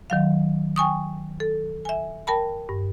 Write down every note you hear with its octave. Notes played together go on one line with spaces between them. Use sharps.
D#3 F#3 F5
G5 G#5 C#6 D#6
A4
E5 G#5
A#4 G5 A5 B5
G2